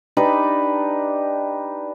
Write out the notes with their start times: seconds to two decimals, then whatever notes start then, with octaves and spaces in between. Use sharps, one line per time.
0.17 D4 D#4 G4 B4